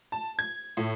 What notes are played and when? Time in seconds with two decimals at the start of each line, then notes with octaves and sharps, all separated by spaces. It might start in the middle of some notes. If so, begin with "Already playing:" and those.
0.12 A5
0.39 G#6
0.77 A2